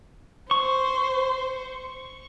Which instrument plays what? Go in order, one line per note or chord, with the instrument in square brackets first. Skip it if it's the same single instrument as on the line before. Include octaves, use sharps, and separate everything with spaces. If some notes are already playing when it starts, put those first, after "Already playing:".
[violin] C5 [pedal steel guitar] C#6